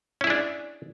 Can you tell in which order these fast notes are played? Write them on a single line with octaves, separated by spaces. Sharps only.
C#4 E4 G#4 D4